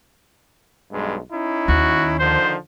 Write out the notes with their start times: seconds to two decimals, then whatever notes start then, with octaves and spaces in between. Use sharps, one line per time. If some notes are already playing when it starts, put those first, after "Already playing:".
0.92 B1 G2 G#3
1.32 C#4 D#4 E4
1.68 D#2 F#4
2.19 D3 D#3 F3 C5